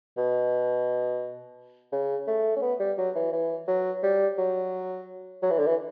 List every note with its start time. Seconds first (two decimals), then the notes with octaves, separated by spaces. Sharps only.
0.17 B2
1.92 C#3
2.27 A3
2.56 C#4
2.62 B3
2.80 G3
2.98 F#3
3.15 E3
3.33 E3
3.68 F#3
4.03 G3
4.38 F#3
5.42 F#3
5.50 E3
5.59 D3
5.67 E3